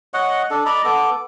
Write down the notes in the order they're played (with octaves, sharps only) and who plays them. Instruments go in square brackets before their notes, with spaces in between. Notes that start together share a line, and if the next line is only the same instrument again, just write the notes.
[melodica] C#5 D#5 F#5
D4 A4
D5 D#5 A#5 B5
B3 A4 D6